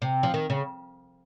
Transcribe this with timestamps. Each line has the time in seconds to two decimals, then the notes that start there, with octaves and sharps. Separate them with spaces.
0.02 C3
0.23 F3
0.34 D#3
0.50 C#3